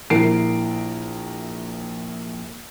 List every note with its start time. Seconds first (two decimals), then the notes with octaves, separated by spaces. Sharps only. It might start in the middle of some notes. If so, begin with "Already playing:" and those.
0.10 A#1 E4 A#4 C7 D7